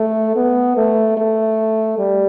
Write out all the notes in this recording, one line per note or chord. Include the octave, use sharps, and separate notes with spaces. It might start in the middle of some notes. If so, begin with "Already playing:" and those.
Already playing: A3
B3
A3
A3
G3